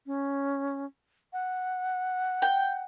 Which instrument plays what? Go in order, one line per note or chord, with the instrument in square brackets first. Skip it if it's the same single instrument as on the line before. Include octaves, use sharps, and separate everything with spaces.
[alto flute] C#4
F#5
[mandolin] G5